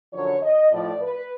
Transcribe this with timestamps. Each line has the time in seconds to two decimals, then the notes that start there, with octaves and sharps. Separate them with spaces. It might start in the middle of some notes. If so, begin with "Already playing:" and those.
0.13 F#2 D3 F3 C#5
0.42 D#5
0.71 A2 F3 D5
1.01 B4